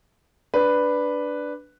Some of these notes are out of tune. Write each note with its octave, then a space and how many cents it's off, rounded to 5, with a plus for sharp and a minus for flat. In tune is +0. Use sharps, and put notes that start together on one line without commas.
D4 +0 B4 +0